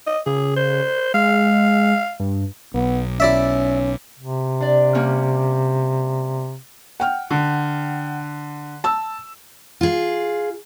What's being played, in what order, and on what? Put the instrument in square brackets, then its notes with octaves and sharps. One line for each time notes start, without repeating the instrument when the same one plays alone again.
[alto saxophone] D#5
[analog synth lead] C#3 [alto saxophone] G#4
[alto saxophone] C5
[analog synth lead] G#3 [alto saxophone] F5
[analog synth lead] G2
[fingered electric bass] B1 [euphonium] B3
[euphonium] C#4 [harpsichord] E4 D5 E5
[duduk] C3
[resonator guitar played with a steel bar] D4 D5
G3 A#3 C#4
[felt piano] F#5 G5 F6
[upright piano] D3
[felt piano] A5 E6
[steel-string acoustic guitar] F4 G#4